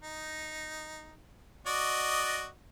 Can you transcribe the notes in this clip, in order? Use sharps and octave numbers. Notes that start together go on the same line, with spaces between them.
D#4
F#4 D5 D#5